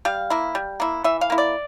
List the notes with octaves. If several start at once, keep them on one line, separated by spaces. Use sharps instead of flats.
G3 F5
A#3 E4
G3
A#3 E4
E3 E5
F5
A#3 E4
D5